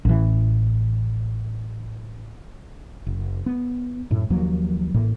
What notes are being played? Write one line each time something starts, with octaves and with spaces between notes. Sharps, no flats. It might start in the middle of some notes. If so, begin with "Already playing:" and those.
A1 E3
F#1
B3
F#2 A2
D#2 F3 F#3 A#3
A1 A2 A#3